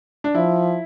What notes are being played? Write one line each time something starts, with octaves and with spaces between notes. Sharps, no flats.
D4
F3 E4